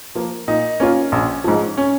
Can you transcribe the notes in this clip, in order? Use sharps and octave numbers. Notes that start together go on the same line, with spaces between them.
F3 A#3
A#2 D#4
A#3 C#4 F4
A#1
G#2 F3
C#4